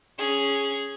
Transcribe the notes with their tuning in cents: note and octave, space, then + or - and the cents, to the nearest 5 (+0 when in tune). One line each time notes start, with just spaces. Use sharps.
C#4 +0 G#4 +0